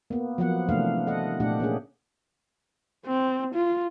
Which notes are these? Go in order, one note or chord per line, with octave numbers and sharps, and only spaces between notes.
A#3 B3
F3 F#3 A#3 B3 F#5
C3 E3 A3 A#3 D4 F5
A4 D#5 F#5
A#2 A3 D4 G4 F#5
A#3 C#4 G#4
C4
F4